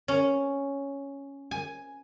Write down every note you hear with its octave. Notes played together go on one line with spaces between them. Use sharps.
C#4
G#5